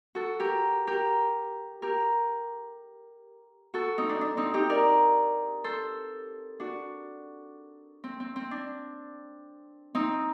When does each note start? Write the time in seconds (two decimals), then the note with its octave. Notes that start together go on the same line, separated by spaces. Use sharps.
0.15 F#4 A4
0.40 G4 A#4
0.87 G4 A#4
1.82 G4 A#4
3.74 F#4 A4
3.98 C4 D#4
4.09 D4
4.21 D4
4.37 C4 D#4
4.54 D#4 G4
4.69 A#4 D5
5.64 A4 C5
6.60 D4 F#4
8.04 C4
8.20 C4
8.36 C4
8.51 D4
9.95 C4 D#4